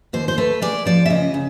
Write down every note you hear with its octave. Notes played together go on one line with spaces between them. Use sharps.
D#2 C5
C5
A3 B4
G#3 D5
F3 D5
E5
C#3 D#5
C#3